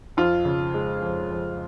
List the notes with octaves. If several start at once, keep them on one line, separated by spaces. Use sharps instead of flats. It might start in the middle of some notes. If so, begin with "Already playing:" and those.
F2 F4
C#3
G#3
F2
F2